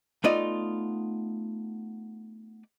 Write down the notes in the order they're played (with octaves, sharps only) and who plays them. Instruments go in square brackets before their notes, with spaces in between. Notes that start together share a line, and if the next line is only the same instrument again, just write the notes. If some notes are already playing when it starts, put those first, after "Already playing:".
[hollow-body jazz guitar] A3 B3 D#4 F4 D5 D#5